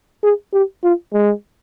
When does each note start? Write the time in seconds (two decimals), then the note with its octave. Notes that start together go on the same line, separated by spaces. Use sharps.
0.23 G#4
0.54 G4
0.84 F4
1.13 G#3